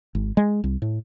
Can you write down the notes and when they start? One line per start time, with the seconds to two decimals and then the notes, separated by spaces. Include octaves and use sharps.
0.15 G#1
0.37 G#3
0.64 C2
0.82 A2